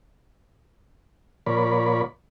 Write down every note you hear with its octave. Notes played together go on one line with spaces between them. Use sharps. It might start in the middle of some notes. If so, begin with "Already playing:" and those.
A#2 F3 A#4 C#5 D5 B5